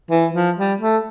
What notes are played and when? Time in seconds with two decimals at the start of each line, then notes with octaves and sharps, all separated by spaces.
0.11 E3
0.34 F3
0.58 G3
0.81 A3